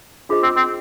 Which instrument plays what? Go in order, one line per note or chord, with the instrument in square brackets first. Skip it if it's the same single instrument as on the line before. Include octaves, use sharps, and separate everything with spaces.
[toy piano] D4 F4 G#4 C5 D#5
[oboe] C4
C4